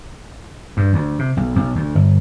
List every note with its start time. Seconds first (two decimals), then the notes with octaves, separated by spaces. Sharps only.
0.77 G2
0.93 D2
1.19 C3
1.37 B1
1.55 B1
1.75 D2
1.95 G1